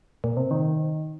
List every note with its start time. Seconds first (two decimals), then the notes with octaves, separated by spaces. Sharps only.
0.24 A#2
0.37 C3
0.51 D#3